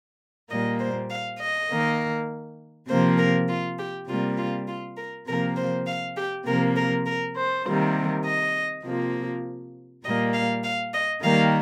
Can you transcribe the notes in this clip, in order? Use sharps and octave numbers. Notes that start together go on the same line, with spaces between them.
A#2 G3 A#3 D#5
C5
F5
D#5
D#3 A#3
C3 F3 A#3 C5
A#4
F4
G4
C3 G3 A#3 F4
F4
F4
A#4
C3 F3 A#3 A#4
C5
F5
G4
C3 F3 A#3 A#4
A#4
A#4
C5
C3 D#3 G3 A#3
D#5
C3 F3 A#3
A#2 G3 A#3 D#5
F5
F5
D#5
D#3 G3 A#3 F5